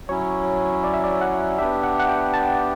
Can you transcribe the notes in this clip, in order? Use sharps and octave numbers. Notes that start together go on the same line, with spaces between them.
F#3 C#4 E4 C#5
D5
E5
D5
F#5
B3 D4 G4 E5
F#5
F#5
G5
A5